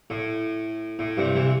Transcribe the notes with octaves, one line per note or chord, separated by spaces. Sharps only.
A2
A2
G2 C3
C3 E3